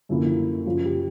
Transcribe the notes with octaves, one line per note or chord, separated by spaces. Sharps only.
F#2 D3 F3 A#3 E4
F#2 C#3 F3 F4
G4